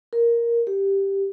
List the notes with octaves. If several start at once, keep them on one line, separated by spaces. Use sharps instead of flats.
A#4
G4